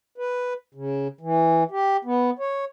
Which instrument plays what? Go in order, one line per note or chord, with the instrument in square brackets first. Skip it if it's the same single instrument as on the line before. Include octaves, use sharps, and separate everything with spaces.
[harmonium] B4
C#3
E3
G4
B3
C#5